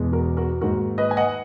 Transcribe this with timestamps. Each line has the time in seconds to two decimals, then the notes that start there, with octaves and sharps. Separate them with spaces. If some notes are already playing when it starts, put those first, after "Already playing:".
Already playing: E2 B2 G#3 B3
0.12 F#4 A#4
0.37 F#4 A#4
0.61 G#2 D#3 A#3 F#4 A#4
0.98 B4 D#5
1.11 G#5
1.17 D#5 F#5